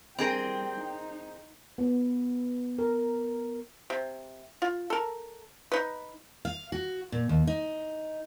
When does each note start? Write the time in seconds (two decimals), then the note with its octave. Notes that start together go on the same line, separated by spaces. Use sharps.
0.19 G3 C4 G#4 A#4 G5
0.79 D#4
1.78 B3
2.79 A#4
3.90 C3
4.62 F4
4.90 A4 A#4
5.72 D#4 B4
6.45 F5
6.72 F#4
7.12 A#2
7.29 D#2
7.47 D#4